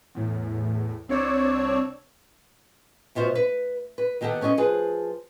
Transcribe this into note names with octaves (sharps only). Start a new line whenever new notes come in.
E2 A2
C2 C4 D4 C#5 D5 E6
D2 B2 F4 C5
B4
B4
D#3 B3 G4 A4 F#5
B3 C#4 D#4 C5 D#5
F3 G#4 B4